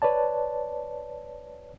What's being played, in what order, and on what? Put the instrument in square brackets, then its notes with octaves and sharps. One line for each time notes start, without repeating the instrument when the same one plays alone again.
[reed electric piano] B4 C#5 D5 A5